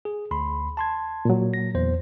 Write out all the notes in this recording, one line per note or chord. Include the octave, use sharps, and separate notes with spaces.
G#4
D2 B5 C6
A5 C6 G#6
A#2 F#3
A#6
E2 C5